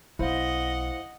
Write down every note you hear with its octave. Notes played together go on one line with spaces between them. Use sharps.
B1 C4 E4 C5 D#5 F5 F#5